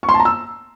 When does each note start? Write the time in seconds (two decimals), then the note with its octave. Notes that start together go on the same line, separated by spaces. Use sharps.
0.03 C#6
0.09 C6
0.14 A5
0.20 A#5
0.25 E6